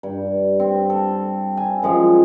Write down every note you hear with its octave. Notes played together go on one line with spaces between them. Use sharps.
G2
C4
A4
G#5
F#2 F3 G#3